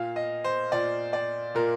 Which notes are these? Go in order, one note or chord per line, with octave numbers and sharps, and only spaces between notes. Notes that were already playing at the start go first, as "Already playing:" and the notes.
Already playing: A#2 F5
D#5
C5
A#2 D5
D5
A#2 A#4